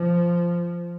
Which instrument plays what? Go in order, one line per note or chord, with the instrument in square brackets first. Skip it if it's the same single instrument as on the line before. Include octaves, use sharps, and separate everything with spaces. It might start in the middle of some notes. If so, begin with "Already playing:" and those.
Already playing: [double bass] F3